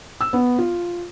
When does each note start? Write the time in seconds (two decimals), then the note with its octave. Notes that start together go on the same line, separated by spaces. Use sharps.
0.21 E6
0.33 B3
0.59 F4